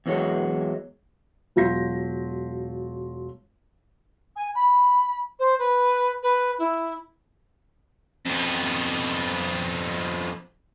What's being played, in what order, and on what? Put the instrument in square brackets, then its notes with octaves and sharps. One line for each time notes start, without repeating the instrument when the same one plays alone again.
[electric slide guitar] E2 E3 F#3 G#3 C#5
[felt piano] E1 F#3 F4 G6 A#6 B6
[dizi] G#5
B5
C5
B4
B4
E4
[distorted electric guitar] F2 B3